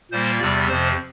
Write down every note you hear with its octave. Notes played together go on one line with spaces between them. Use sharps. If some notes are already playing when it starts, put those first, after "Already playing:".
A#2 G3 A#3 C5
E2 C3 G3 D5
F2 C3 F3 C5